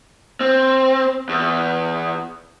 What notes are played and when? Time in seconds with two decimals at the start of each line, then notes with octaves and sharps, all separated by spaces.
0.41 C4
1.29 E2